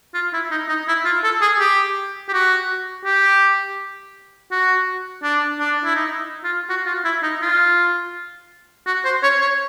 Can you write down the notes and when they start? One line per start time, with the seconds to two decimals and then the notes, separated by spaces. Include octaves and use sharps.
0.14 F4
0.33 E4
0.51 D#4
0.69 D#4
0.88 E4
1.05 F4
1.24 A4
1.41 G#4
1.60 G4
2.29 G4
2.33 F#4
3.05 G4
4.51 F#4
5.23 D4
5.59 D4
5.85 E4
5.96 D#4
6.44 F4
6.69 F#4
6.86 F4
7.05 E4
7.23 D#4
7.42 F4
8.87 F#4
9.05 C5
9.23 C#5
9.41 C#5